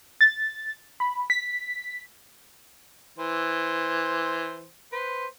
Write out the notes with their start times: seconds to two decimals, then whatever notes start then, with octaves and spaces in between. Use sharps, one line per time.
0.21 A6
1.00 B5
1.30 B6
3.18 E3 C5
4.92 B4 C5